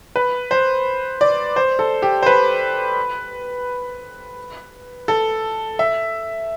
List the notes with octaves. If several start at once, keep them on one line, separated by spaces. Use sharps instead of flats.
B4
C5
D5
C5
A4
G4
C5
B4
A4
E5